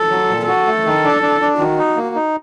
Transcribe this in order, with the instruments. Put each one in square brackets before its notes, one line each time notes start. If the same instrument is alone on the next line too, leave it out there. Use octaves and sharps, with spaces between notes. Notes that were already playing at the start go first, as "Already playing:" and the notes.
Already playing: [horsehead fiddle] A4
[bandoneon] F#3
A#2
[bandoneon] F#4 [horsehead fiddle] A4
[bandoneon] A3
D#3
D4
D4
D4
[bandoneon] D#3 [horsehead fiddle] F#4
[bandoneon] D#4
A#3
D#4